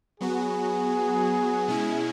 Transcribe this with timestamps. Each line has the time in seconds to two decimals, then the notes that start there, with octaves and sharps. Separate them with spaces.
0.20 F#3 B3 F#4 G#4
1.68 B2 G#3 C#4 E4